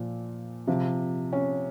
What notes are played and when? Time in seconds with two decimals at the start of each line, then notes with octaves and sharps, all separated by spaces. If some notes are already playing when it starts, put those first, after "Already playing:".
Already playing: A#2 F3
0.67 C3 F3
1.33 C#4